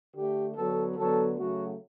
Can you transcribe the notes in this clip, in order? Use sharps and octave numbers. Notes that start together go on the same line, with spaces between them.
D3 A3 G4
D3 F#3 B3 A4
D3 F#3 B3 A4
C#3 F#3 A3 F#4